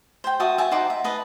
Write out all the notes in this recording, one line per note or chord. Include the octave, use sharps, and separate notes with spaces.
C5 G5
F#4 E5 A5 D#6
E5 G#5 A5
D#4 C5 F#5 D6
E5
B4 D#5 A5